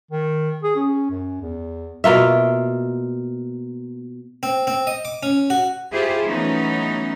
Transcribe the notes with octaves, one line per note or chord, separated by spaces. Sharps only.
D#3
G#4
C#4
F#2
E2
B2 A#3 F4 E5
C4
C4
D#5
D6
C#4
F#4
E4 F4 G4 G#4 C5
E3 F#3 A3 B3 C#4 D#4